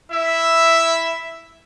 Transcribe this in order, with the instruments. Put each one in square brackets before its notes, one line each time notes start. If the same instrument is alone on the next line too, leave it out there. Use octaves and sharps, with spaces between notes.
[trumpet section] E4 E5